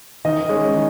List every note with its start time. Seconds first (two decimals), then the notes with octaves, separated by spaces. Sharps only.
0.25 D#3 D#5
0.49 G#3 C#4
0.74 D#3